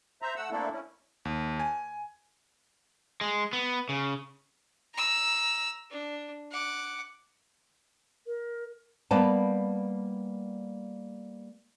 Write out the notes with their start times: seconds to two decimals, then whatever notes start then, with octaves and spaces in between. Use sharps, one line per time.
0.22 C5 E5 A#5
0.36 A3 F#5 E6
0.51 A3 A#3 C4 D4 E4 A4
0.72 C#4 E4
1.25 D#2
1.60 G#5
3.21 G#3
3.53 B3
3.89 C#3
4.95 A#5 E6
5.91 D4
6.51 F#5 D6
8.27 A#4
9.11 G3 A#3 B3 B4 A5